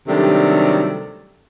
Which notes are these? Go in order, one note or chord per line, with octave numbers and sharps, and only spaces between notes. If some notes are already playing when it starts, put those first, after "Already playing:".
C3 D#3 F#3 G3 A3 D4